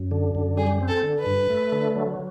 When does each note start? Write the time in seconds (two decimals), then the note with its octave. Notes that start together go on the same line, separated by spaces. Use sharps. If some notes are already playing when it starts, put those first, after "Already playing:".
Already playing: F#2
0.11 D3
0.35 F#2
0.57 G3 G#4
0.81 C4
0.88 A4
1.03 D3
1.19 B4
1.26 G2
1.50 A3
1.72 D3
1.96 F#3